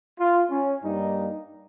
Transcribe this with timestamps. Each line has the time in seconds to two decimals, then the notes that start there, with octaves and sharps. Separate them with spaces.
0.19 F4
0.50 C#4
0.83 G2 G3 A#3 D#4